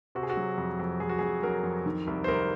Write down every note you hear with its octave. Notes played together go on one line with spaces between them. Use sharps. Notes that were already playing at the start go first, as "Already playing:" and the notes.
C3 F#4
G#4
F#4
F#3
F2
F2
F2 G#4
F#4
F2 G#4
F#3 A#4
F2
D#3
C2
C5
C2 A#4